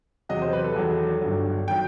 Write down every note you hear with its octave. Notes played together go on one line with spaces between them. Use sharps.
E2 C3 F#3 D#5
C5
B4
A4
E2 D#3 F#3
G1 G2 F#3
D#3 F#3 G5